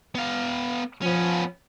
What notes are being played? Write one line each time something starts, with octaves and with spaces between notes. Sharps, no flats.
B3 F5
F3 B3 C#4